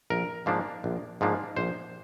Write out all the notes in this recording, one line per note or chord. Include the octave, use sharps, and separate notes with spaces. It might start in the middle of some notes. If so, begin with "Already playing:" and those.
A#1 A#4
G#2 F3 A#3 D4
A#1
G#2 F3 A#3 D4
A#1 C5